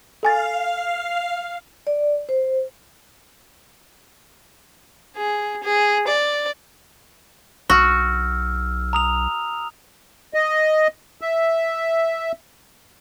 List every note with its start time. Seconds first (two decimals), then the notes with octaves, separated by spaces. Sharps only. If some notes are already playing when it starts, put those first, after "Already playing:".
0.23 A4 F5 G#5 A6
1.87 D5
2.29 C5
5.16 G#4
5.63 G#4
6.07 D5
7.70 B1 F#4 E6 F6
8.93 A#5 D#6 F7
10.34 D#5
11.21 E5